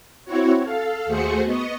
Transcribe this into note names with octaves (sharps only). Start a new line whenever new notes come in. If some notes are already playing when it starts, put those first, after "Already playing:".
C4 E4 F#4 C#5
A4 F5
D#2 A3 F#4 G#4 C5 C#7
B3 D#5 C#6